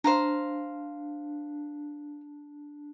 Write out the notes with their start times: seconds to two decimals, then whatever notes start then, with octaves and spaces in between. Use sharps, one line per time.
0.04 D4 C5 F5 A#5